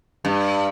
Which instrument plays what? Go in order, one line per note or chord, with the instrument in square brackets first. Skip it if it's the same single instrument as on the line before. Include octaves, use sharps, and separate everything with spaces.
[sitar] G2